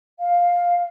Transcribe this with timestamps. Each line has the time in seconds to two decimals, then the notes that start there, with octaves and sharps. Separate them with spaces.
0.19 F5